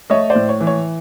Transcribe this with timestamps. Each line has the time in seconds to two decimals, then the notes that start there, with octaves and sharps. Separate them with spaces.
0.10 A3 C#5 D#5
0.30 C5 D5
0.35 A2
0.49 C#5
0.61 E3
0.67 C#5